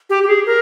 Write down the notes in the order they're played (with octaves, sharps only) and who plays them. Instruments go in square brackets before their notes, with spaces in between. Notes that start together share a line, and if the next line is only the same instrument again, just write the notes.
[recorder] G4
G4
G#4
A#4